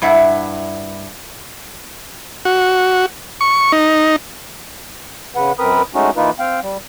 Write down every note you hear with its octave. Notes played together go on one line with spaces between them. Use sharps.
G2 E4 E5 F#5
F#4
C#6
D#4
C#3 B4 F#5
F#2 C4 A#4 B4 B5 D#6
G#3 A3 C#4 D#4 F#4
E3 A#3 D#4 F4 B4
C4 F5 G5
G3